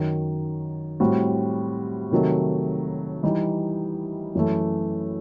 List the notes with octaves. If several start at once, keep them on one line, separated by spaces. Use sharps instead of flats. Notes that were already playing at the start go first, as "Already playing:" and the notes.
Already playing: F#2 D#3 F#3
A2 G3 C4 F#4
C3 D#3 F#3 A3
E3 G3 D#4
F#2 E3 A3